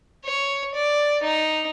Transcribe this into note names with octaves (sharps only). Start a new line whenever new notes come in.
C#5
D5
D#4